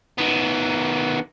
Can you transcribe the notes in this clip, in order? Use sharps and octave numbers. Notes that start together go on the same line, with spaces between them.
D#3 B3